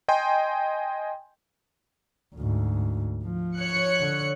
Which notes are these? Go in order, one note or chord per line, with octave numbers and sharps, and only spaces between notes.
D#5 G5 G#5 C6
D2 G#2
F3
C#5 F#6 C#7
D3